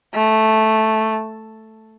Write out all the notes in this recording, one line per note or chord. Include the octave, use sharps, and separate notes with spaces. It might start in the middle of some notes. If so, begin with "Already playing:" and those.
A3